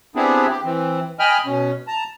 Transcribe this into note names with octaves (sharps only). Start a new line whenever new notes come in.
B3 C4 D4 E4 G4 G#4
G4
E3 C4
D#5 G5 G#5 B5 F6
B2 C#4
A5 A#5